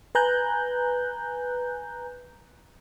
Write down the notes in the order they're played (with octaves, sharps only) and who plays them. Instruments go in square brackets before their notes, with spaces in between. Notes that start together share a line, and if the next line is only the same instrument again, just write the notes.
[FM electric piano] B4 G#5 A#5 F#6 G6